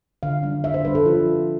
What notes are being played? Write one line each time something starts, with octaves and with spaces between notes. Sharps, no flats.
D3 F5
G3 D4
D3 E5
C5
G3 D4 B4
A4
F3 F4
C4